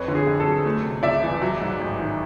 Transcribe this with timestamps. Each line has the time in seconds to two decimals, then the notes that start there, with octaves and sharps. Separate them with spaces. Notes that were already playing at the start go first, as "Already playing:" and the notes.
Already playing: F2 B4 C#5
0.08 D3
0.15 G#4
0.27 F2
0.40 A4
0.46 F#3
0.66 A3
0.84 C3
1.03 C#2 D5 E5
1.23 E3
1.42 F#3
1.61 G#2
1.80 A1
1.99 D#3